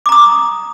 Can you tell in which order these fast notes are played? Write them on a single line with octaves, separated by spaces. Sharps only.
D6 A#5 D#6